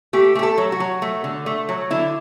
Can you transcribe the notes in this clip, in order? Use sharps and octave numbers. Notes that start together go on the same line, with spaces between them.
A3 G4
A3 G4
A4
F#3
F#4
F#3
A3
D3
A3
F#3
D3 E4